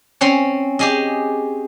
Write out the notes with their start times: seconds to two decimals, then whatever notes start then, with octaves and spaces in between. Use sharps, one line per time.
0.21 C4 C#4 C#5
0.79 G4 G#4 D#5